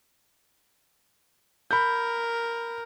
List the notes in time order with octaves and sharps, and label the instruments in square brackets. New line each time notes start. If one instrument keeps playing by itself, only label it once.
[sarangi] A#4 [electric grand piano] B5 G6